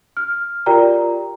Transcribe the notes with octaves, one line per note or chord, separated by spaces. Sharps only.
F6
F4 G4 A#4 D5 G5 A#5